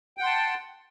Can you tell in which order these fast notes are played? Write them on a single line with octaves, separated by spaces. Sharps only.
G5 F#5 C6 A5